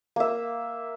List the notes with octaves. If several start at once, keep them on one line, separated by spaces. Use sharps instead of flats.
A#3 E5